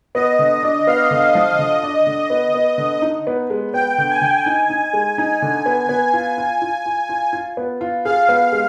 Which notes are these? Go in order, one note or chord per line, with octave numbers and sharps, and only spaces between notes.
B3 D#5
D3
D4
B3 F5
D3
F3
D3 D#5
D4
D3
B3
B3
D3
D#4
B3
G#3
B3 G5
D3
G#5
D3
D#4
D#4
G#3
D#4
D3
B3
B3 G#5
F4
F4
F4
F4
F4
F4
B3
F4
G#4 F5
B3
G#3